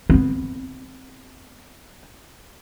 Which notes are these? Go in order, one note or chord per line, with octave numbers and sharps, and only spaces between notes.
B3 C4